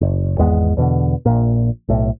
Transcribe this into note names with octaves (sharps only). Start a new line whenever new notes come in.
F#1
G#1 E2 G#3 B3
E2 B2 D3
A#1 A#2
B1 A2